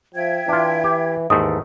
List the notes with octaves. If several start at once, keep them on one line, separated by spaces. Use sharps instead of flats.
F3 E5 G5 G#6
E3 D4 F4
G4
D#2 G#2 E3 A3 D#6